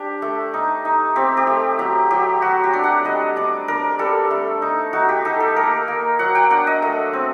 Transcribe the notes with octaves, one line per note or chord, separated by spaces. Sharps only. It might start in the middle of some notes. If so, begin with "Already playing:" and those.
Already playing: D4 G4
A3
D#4
D#4
C4 G4
G4
A3
F#3 G4
F#3 G4
F#3 F#4
G4
D4
F#5
G3 D#5
D4 D5
D4 A#4
G3 A4
A3
D#4
D#4 F#4
G4
D#4 A4
A4
A#3 A#4
A#3
F#3 F#5
G5
D4 F#5
D#5
A3
C4